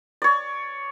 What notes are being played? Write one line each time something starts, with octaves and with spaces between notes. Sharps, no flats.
C#5 D5